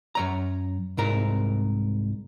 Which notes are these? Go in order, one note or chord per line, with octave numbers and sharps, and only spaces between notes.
F#2 C#5 A#5
C2 G#2 A#4 A#5